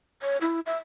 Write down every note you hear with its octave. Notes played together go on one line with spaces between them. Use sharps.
C#5
E4
E5